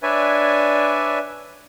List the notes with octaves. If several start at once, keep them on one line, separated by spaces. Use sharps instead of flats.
D4 B4 C#5 D5 E5 G#5